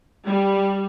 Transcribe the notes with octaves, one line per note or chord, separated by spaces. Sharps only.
G3